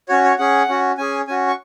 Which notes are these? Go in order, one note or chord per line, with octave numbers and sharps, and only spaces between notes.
C#4 F#4 C#5
C#5
C#4 G#4 F#5
C#4 F#4
C#4 G#4 G#5
C#4 F#4 G#5
C#6